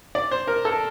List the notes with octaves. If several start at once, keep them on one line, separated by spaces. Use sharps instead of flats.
D5
C5
A#4
A4